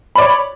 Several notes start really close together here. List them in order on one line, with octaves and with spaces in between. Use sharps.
B5 D5 C#5